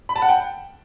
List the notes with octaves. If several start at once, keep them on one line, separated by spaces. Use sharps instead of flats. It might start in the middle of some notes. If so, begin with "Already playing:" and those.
B5
A5
F#5
G5